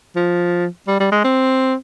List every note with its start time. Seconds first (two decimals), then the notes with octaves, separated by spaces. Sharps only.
0.16 F3
0.88 G3
1.00 G3
1.12 G#3
1.24 C4